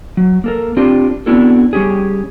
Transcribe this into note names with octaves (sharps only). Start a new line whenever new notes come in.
F#3
A#3 A4 A#4
C4 D4 F4 G4
B3 C4 D4 E4 F#4 A4
G3 C#4 G4 G#4